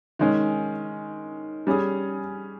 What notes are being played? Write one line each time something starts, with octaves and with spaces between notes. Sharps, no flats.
D#3 G#3 C#4
G3 C#4 G#4